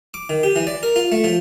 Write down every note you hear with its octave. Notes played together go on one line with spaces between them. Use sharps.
D6
D#3
G4
E3
D5
A#4
F4
A3
F3